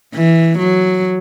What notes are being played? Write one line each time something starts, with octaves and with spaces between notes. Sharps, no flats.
E3
F#3